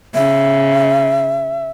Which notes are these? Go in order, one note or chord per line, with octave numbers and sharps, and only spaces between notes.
C#3 E5